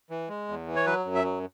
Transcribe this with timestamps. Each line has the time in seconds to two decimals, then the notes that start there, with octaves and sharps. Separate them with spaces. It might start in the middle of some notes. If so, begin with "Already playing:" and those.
0.10 E3
0.29 G#3
0.48 E2
0.67 E3
0.76 C#5
0.86 F#3 B4
1.05 F#2
1.15 E5
1.24 F#3